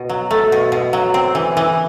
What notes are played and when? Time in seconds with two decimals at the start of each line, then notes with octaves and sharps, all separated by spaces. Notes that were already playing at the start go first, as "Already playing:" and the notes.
Already playing: B2
0.09 F#3
0.31 A3
0.52 B2
0.72 B2
0.93 F#3
1.14 C4
1.35 E3
1.57 E3